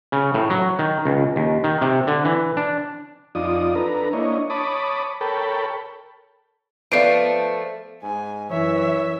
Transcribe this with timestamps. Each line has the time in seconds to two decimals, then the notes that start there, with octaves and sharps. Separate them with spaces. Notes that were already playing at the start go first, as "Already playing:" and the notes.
0.12 C#3
0.34 A2
0.50 F#3
0.79 D#3
1.05 C#2
1.36 D#2
1.64 D#3
1.81 C3
2.07 D3
2.25 E3
2.57 D4
3.35 F2 D#4 F4 D5 D#6
3.75 D4 A4 B4 A#5
4.13 A#3 D4 E4 C#5 D#5
4.50 C#5 A5 B5 D6 D#6
5.21 A4 A#4 C#5 G5 A5 B5
6.92 F3 A3 B3 D5 F5 C7 D7
8.03 G#2 G#5
8.51 F#2 E3 C#5 E5